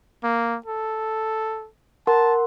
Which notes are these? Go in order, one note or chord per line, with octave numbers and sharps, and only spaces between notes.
A#3
A4
A#4 F#5 A5 C6